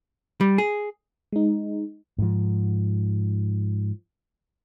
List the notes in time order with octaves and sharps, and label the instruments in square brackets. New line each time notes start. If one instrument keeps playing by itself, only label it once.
[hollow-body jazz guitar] G3
G#4
[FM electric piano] G#3 D#4
[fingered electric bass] G#2 F3